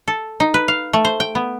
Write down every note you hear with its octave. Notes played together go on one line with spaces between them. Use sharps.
A4
D#4
B4
F5
A3
C5
G5
B3